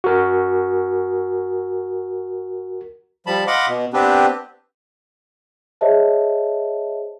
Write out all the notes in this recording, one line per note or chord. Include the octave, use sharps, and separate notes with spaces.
F#4 A#4
F3 G3 A5 B5
D#5 F5 F#5 B5 C6 D6
B2
B3 C4 D4 G4 B4
G#4 C5 C#5 D#5 E5 A5